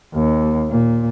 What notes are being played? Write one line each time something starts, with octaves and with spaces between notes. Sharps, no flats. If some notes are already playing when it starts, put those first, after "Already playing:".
D#2
A#2